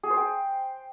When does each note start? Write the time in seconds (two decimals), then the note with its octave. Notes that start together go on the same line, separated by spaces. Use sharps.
0.03 G#4
0.10 C5
0.17 G5